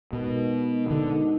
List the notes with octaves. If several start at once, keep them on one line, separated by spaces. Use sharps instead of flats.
B2 G#3 D#4 F#4 A#4 D#5
D3 G#3 D#4 F#4 A#4 D#5